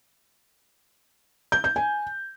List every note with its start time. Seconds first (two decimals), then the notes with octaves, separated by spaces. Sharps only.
1.52 G6
1.64 G6
1.76 G#5